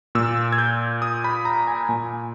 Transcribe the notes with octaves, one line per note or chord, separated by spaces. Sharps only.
A#2 E6
G#6
G6
D#6
B5
A#5
G#5
A#2 G#5